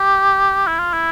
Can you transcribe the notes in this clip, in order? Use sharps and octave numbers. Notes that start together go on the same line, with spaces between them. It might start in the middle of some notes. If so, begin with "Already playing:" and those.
Already playing: G4
E4
F4
E4